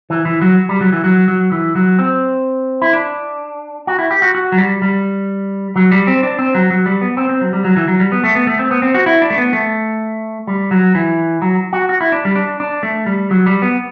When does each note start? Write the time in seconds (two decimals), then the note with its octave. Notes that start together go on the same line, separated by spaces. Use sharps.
0.10 E3
0.25 E3
0.41 F#3
0.69 G3
0.81 F#3
0.92 E3
1.04 F#3
1.28 F#3
1.52 E3
1.75 F#3
1.99 C4
2.82 E4
2.93 D4
3.87 F#4
3.99 E4
4.11 G4
4.22 F#4
4.35 F#4
4.52 F#3
4.58 G3
4.82 G3
5.76 F#3
5.91 G3
6.07 C4
6.23 D4
6.39 C4
6.55 F#3
6.70 F#3
6.86 G3
7.01 B3
7.17 C4
7.29 C4
7.41 F#3
7.53 G3
7.64 F#3
7.76 E3
7.88 F#3
8.00 G3
8.12 B3
8.24 A3
8.35 B3
8.47 A3
8.59 C4
8.71 B3
8.82 C4
8.94 F#4
9.06 E4
9.22 D4
9.30 A3
9.38 B3
9.53 A3
10.47 G3
10.71 F#3
10.95 E3
11.42 F#3
11.73 F#4
11.89 F#4
12.01 E4
12.12 D4
12.25 G3
12.36 D4
12.60 D4
12.83 A3
13.06 G3
13.31 F#3
13.46 G3
13.62 B3